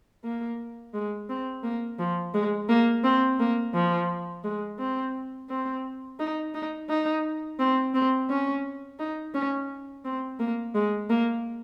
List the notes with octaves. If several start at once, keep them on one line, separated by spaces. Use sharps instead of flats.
A#3
G#3
C4
A#3
F3
G#3
A#3
C4
A#3
F3
G#3
C4
C4
D#4
D#4
D#4
C4
C4
C#4
D#4
C#4
C4
A#3
G#3
A#3